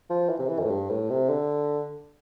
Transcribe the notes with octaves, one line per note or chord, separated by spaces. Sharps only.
F3
E3
C3
E3
F2
A2
G2
A2
C3
D3